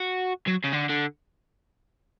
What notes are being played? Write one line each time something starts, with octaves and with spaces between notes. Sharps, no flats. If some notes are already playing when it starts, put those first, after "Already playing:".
Already playing: F#4
F#3
C#3
D3
D3